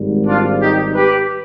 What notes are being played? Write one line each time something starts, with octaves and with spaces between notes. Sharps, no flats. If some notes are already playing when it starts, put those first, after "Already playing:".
Already playing: G#1 G#2 G3
D4 F4
D#4 G4
G4 B4